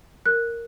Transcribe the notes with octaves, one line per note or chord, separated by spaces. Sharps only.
A#4 F#6